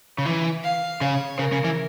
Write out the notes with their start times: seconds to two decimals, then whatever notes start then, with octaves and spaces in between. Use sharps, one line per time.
0.18 C#3
0.26 E3
0.64 F5
1.01 C#3 C#5
1.39 C#3 A#4
1.52 C#3
1.64 E3